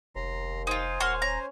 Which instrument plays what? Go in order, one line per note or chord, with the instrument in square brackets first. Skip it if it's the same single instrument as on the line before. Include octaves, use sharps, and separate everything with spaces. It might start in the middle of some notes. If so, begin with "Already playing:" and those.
[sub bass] F1 [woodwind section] D#2 [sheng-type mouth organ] A#5 C6
[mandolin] D#4 F4 [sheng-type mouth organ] C5 G#5
[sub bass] D#1 [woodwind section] F#2 C#6 F6 [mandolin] F#4 C6
[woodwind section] C#4 [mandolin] A#5